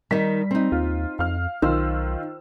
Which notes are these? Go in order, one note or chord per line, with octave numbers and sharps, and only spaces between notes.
D#3 G3 D#4 B6
C4 D#4
D#2 F4
F2 F5 F6
B1 D#3 F4 C5 E6